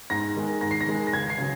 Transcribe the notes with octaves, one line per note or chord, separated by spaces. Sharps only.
G#2 A#6
D#3 G#3
G#2 A#6
C7
A#6
D#3 G#3
A#6
C#2 G#6
C7
C#3 F#3